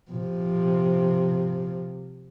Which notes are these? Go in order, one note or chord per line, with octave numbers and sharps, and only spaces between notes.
C3 F3